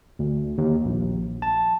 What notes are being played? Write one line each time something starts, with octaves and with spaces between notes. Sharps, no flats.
D2
D#2
A#1
A5